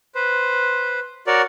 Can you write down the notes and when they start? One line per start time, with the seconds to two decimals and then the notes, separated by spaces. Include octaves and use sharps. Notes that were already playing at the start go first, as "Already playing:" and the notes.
0.15 B4 C5
1.27 F#4 A#4 C#5 D5